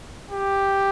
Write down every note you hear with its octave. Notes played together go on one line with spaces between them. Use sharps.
G4